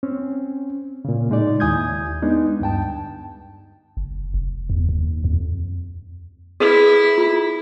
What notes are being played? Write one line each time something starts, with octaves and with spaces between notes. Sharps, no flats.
C4 C#4
A#2 C#3
A2 G#3 D#4 D5
D#2 E4 G#5 D#6 G6 G#6
G#3 B3 D4 D#4
D2 G2 G5 A5
F#1
F1
E2
D#2
F2
E4 G#4 A4 B4
F4